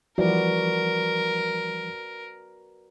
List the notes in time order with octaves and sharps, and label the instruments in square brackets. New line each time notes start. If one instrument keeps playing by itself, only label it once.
[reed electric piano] E3 F3 G3 [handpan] F#4 B4 D5 [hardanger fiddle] A#4